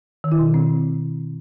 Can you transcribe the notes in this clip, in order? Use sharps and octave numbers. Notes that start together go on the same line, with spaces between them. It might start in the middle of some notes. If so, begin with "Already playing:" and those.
D#3
E4
B2
D#3
C4